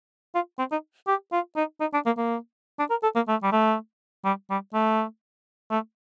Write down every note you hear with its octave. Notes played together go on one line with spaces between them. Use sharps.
F4
C4
D#4
G4
F4
D#4
D#4
D4
A#3
A#3
D4
A#4
A4
A#3
A3
G3
A3
G3
G3
A3
A3